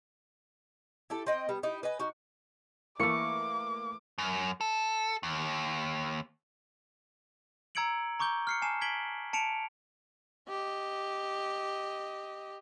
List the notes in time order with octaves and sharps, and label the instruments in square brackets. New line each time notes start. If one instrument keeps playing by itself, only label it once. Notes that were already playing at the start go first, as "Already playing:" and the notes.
[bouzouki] E4 G4 A4
C4 D#5 G5
G3 B3
D#4 E4 G4
B4 D#5 G#5
D#4 F#4
[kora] E3 A3 [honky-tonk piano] A#3 [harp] C#6 C#7 [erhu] D6
[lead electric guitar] F#2
A4
D#2
[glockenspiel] A#5 E6 G#6 C#7 D7 F#7
A#5 C#6 D6 G6 G7
F6 C7 C#7
G#5 A5 D6 C7 E7
G#6 B6 D7 F#7 G7
A5 C#7 D7 F7
[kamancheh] G4 D#5